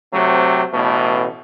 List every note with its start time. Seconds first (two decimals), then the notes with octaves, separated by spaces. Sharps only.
0.13 C3 F#3 A3 C4
0.73 A1 B2 A3